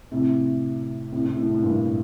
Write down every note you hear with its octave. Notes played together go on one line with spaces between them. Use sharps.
A2 C3
A2 C3
A2 C3
A2
A2
G2 A#2